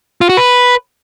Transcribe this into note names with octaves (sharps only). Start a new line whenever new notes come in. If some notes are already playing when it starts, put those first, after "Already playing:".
F4
F#4
B4